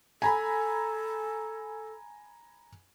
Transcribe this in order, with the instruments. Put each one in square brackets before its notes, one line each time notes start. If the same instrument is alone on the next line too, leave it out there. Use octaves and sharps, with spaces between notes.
[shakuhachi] A4 [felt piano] G#5 A#5 B5